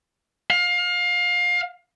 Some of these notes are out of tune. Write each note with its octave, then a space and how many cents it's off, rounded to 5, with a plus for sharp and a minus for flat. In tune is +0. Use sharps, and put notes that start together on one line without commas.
F5 +25